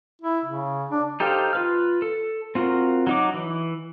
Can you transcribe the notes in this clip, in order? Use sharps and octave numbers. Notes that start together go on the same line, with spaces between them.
E4
C#3
D4
D#4 G4 A4 C5 F5
F4 B4 F6
A4
C4 F4 F#4 A#4
F#3 D#4 D6
E3